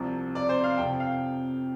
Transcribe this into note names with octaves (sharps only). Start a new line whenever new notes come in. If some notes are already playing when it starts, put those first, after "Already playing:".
Already playing: C2 C3 F3
D5
C5
F5
F2 C3 F3 G5
F5